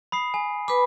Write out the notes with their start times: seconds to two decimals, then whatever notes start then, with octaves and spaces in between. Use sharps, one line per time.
0.12 B5 D#6 C7
0.34 G#5
0.68 B4 B5 D6